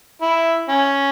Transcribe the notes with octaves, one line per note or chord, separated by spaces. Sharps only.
E4
C#4